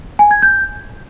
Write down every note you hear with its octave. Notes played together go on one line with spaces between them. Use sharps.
G#5
G#6
G6